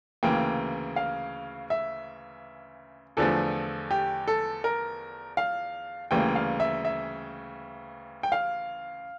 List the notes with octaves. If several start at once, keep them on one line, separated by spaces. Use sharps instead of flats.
D2 C#3 E3 A#3 G5
F5
E5
E2 D3 F3 A3 A4
G4
A4
A#4
F5
D2 C#3 E3 G3 A#3 G5
F5
E5
E5
G5
F5